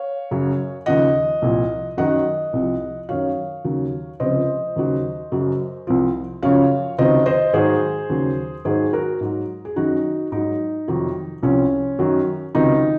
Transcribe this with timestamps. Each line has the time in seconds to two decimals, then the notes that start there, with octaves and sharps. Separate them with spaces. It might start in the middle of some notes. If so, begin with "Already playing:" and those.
Already playing: C#5 F5
0.31 F#2 C#3 F#3
0.86 D#2 C#3 F3 D#5 F#5
1.42 C2 A#2 F3
1.97 F#2 D#3 F#3 D#5 F#5
2.53 C2 C3 F3
3.09 F#2 D#3 F#3 C#5 F5
3.65 D#2 C#3 F#3
4.20 C#2 C3 F3 C5 D#5
4.76 D#2 C#3 F#3
5.32 F#2 C#3 F#3
5.87 C2 C3 F3
6.43 F#2 C#3 F3 C#5 F5
6.98 C#2 C3 D#3 F#3 C5 D#5
7.26 C5 D#5
7.53 G#2 D#3 F#3 G#4 C5
8.10 D#2 C#3 F#3
8.65 G#2 D#3 F#3 G#4 C5
8.93 F#4 A#4
9.21 G#2 F#3
9.65 G#4
9.76 F#2 D#3 F#3 D#4 F#4
10.32 G#2 F#3 D#4
10.88 F2 C3 D#3 F#3
11.43 C2 C3 F3 C#4
11.99 F#2 D#3 F#3
12.55 C#2 C3 D#3 F#3 D#4